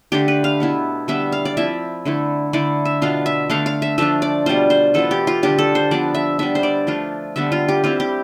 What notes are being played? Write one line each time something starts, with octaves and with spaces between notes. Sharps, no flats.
D3 A3 D4 G4
B4
F5
B2 B3 E4
D3 G3 B3 E5
F5
D5
F3 C4 E4 E5
D3 A3 E4
D3 A3 E4 D5
E5
B2 B3 D4 F4 F5
E5
D3 A3 D4 F5
F5
E5
F3 A3 D4 F4 E5
D5
B2 G3 D4 F4 C5
C5
E3 B3 F4 A4
G4
F4
D3 G3 D4 G4
A4
C5
F3 B3 D4 D5
E5
G3 B3 D4 E5
C5
D5
F3 A3 D4 F4
D3 G3 B3 E5
F4
G4
G3 C4 E4 F4
G4